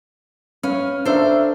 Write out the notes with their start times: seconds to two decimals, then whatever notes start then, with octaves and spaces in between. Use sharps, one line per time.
0.63 C#4 B4 F5
1.05 A3 D4 C5 E5 A#5